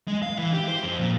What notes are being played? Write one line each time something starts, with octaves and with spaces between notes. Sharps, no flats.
G#3
F5
E3
G4
C5
F2
A#2